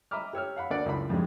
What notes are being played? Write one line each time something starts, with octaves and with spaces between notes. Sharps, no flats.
D#5 E5 A#5 B5 D6 F6
G4 C#5 E6 F6
F5 F#5 B5
D2 A#3 A4 D5 F#5
C#2 F#2 A3 E4 F4 B5
F2 G#2 G3 G#3